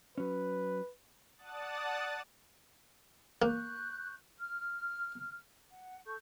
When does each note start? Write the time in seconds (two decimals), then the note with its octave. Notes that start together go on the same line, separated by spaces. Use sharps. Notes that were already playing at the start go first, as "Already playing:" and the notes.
0.18 F#3 C#4 B4
1.37 D5 F#5 A5 D#6 F#6 A6
3.42 A#3 C#6 F#6 G6
4.39 F6
5.71 F#5
6.07 A4 C#6 G6